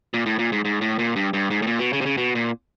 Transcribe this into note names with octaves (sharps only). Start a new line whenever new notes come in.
A#2
A2
A#2
G#2
G#2
A2
A#2
G2
G2
G#2
A2
A#2
B2
C#3
C3
C#3
B2
A#2